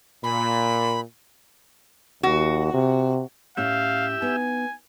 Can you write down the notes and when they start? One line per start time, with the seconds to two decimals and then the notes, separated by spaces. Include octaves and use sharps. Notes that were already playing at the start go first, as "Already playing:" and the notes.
0.24 A#2 B5
2.23 D#2 F#4
2.74 C3
3.57 A2 C#4 G4 E5 F5
4.22 B3 D#4 G#5